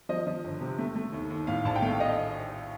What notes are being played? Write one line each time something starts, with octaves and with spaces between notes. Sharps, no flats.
F3 D#5
F3
G1
C3
A3
A3
D#2
D#2
A2 F5
A#1 A5
G5
A3 F5
D#5